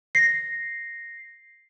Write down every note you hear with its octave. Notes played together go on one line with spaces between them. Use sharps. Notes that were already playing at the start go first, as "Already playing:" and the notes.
A#6 C7